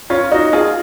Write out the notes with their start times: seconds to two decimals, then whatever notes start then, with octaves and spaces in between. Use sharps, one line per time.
0.10 C#4 F4
0.31 D#4 F#4
0.53 F4 G#4